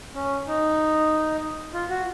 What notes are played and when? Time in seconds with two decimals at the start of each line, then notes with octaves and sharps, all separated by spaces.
0.15 C#4
0.47 D#4
1.74 F4
1.90 F#4